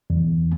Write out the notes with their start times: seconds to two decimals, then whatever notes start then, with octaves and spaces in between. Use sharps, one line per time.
0.10 E2